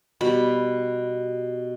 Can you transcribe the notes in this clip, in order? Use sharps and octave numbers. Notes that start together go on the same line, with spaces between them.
B2 G3 B5